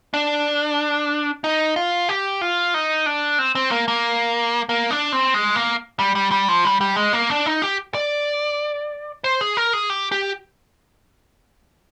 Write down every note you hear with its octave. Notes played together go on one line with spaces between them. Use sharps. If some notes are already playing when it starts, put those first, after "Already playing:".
D4
D#4
F4
G4
F4
D#4
D4
C4
C4
A#3
A#3
A#3
D4
C4
G#3
A#3
G3
G3
G3
F3
G3
G3
G#3
A#3
D4
D#4
G4
D5
C5
G#4
A#4
G#4
G4
G4